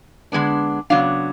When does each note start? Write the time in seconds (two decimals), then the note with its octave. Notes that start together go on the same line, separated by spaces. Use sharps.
0.32 D3 G#3 B3 D4
0.90 C#3 F#3 B3 D4 F5